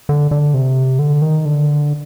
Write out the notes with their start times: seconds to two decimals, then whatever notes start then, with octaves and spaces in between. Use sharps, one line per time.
0.09 D3
0.31 D3
0.54 C3
0.99 D3
1.22 D#3
1.45 D3